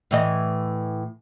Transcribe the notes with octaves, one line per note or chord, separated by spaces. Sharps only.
A2 E3 D#5